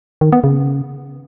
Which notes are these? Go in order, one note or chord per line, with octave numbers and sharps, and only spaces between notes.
D#3
B3
C#3